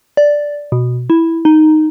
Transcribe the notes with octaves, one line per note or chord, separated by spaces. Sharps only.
D5
B2
E4
D#4